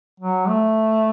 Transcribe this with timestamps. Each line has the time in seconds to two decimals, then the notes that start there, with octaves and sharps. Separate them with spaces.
0.20 F#3
0.48 A3